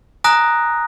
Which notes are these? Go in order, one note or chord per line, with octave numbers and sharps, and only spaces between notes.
G#5 A#5 D#6 F#6 A#6